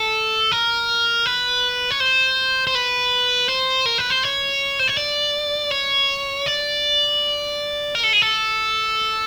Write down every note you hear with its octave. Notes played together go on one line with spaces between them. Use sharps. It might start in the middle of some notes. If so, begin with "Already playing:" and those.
Already playing: A4
A#4
B4
C#5
C5
C5
B4
C5
A#4
B4
C5
C#5
C5
C#5
D5
C#5
D5
A#4
A4
G#4
A4